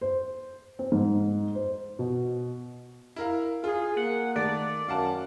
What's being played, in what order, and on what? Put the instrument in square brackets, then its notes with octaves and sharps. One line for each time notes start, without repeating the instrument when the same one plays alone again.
[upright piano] C5
C4
G#2
C5
B2
[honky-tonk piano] E4 A#4 F5
[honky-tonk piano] F4 [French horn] G#4
[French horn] A#3 [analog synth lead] F#5
[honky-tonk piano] D#3 A3 [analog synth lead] D5
[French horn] F#2 [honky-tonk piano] F5 F#5 A5